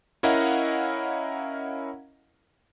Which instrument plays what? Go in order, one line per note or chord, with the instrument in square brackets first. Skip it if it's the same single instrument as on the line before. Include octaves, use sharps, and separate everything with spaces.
[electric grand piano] C#4 E4 A#4 D#5 F5 F#5